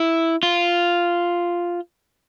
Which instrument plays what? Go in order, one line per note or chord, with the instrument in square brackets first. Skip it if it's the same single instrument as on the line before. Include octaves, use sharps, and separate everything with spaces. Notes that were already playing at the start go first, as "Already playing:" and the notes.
Already playing: [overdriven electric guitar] E4
F4